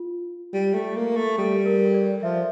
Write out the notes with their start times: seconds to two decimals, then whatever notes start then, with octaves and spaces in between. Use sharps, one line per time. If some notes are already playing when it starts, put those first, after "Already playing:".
Already playing: F4
0.53 G3
0.74 A3
0.96 A#3
1.16 A3
1.38 G3 A4
1.66 A#4
1.94 D5
2.23 F3 E5